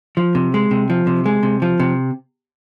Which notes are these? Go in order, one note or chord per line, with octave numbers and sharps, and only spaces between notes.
F3
C3
G#3
C3
F3
C3
G#3
C3
F3
C3